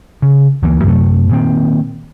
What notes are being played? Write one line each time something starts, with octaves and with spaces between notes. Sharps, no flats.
C#3
D2 E3 F#3 A#3
F#2 C3 F#3 A3
A#2 D#3 C4